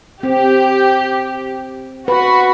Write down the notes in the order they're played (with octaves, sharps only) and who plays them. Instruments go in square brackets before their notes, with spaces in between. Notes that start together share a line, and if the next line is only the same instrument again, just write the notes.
[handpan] C4 [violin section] G4
[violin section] F#4 [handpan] B4